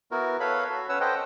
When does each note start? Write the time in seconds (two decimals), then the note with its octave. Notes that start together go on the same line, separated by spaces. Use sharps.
0.11 B3 E4 F#4 A#4
0.40 A4 B4 C#5 F5 B5
0.69 F#4 A4
0.89 C#4 B4 C#5 F#5 E6
1.01 A4 B4 C5 D#5 F#5 G5